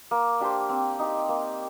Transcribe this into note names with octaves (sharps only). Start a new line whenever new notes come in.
A#3
D4 G4 C5
C4
D#4 G4
A#3